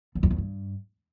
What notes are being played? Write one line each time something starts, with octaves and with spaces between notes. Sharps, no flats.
E2
F2
E2
G2